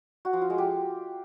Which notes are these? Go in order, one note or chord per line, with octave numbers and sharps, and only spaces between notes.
F#4
F3
F4
G#3
G4